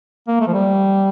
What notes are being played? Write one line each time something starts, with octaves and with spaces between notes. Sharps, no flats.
A#3
A3
F3
G3